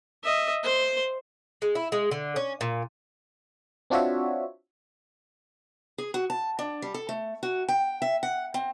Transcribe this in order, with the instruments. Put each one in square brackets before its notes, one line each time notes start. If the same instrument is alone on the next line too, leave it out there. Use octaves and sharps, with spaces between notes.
[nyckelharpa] D#5 E5
C5 C6
[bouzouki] G#3
E4
G#3
D3
C#4
A#2
[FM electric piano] C4 D4 F4 F#4 C#5 E5
[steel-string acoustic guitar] G#4
F#4
A5
D4
G3
A4
A3
F#4
G5
E5
F#5
C4